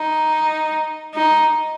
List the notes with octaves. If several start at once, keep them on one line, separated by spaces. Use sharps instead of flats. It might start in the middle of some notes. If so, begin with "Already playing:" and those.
Already playing: D#4
D#4